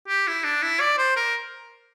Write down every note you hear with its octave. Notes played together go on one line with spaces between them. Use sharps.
G4
E4
D4
E4
D5
C5
A#4